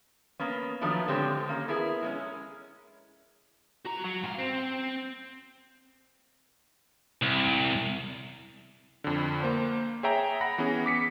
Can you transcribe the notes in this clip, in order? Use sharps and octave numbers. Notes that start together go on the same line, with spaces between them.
A#3 B3 C#4
D#3 F3 F#3 A3 B3 D4
A2 D3 G#3 C4 G4 C#5
D#3 A#3 C#4
B3 E4 G#4 A#4
G#3 A#3 C#4
F#4 A#5
F#3
G#2 F5
C4
C2
F2 D3
A#3 C5
G#4 C#5 E5 G5 A#5
F#5 B5 A#6
E3 B3 C#4 G#4
D6 B6 C#7